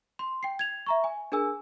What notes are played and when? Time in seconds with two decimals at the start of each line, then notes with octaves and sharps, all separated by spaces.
0.19 C6
0.43 G5 C7
0.59 G#6 F7
0.86 E5 A#5 C#6
1.04 G#5
1.32 D4 G#4 A#4 G#5 E6